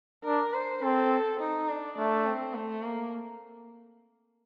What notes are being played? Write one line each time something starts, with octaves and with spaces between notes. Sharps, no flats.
D4 A#4
C5
C4 A4
D#4
D4
A3 D4
C4
A3
A#3